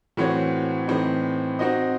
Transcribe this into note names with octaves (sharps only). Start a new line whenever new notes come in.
A2 E3 C4 F#4 C#5
A2 E3 C4 D#4
C4 D#4 F#4 C5 D#5